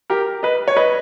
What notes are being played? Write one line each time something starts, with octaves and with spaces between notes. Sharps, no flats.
G4 A#4
B4 D#5
C#5
B4 D#5